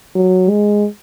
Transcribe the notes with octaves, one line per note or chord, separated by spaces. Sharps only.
F#3
G#3